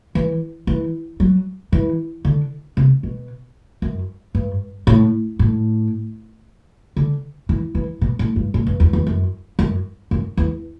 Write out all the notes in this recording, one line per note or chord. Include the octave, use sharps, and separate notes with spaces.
E3
E3
F#3
E3
D3
C3
B2
F#2
G2
A2
A2
D3
E3
E3
B2
A2
G2
A2
G2
E2
E2
F#2
F#2
F#2
E2